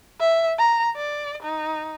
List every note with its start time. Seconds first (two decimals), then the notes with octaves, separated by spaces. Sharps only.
0.20 E5
0.59 A#5
0.96 D5
1.43 D#4